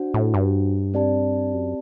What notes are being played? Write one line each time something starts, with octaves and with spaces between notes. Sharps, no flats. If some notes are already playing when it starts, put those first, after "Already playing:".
Already playing: D4 F#4 C5 F#5
A2
G2
C4 G4 D5 A5
F#2